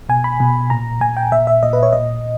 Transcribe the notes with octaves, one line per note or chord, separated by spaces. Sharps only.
B2 G#5
B5
B2
A#2 A#5
A#2 G#5
G5
A#2 E5
E5
A#2 D#5
B4
C#5
A#2 D#5